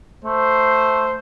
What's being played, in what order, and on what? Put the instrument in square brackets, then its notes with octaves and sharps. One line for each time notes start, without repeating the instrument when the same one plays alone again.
[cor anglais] A3 [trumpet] C5